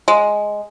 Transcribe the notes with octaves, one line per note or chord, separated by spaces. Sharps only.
G#3